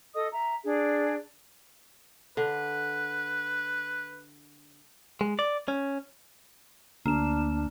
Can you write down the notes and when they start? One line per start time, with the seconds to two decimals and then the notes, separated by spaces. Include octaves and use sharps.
0.14 A4 D#5 D#6
0.32 E5 A#5
0.65 D4 G#4
2.37 D3 B4
5.21 G#3
5.39 D5
5.68 C#4
7.06 D2 A#3 D4 E7